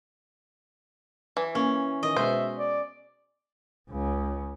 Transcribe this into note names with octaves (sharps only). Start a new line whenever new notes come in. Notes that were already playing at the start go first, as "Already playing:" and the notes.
E3
A#3 C#4
D#3 D#5
B2 G#3 B3 C5 E5
D5
C#2 C#3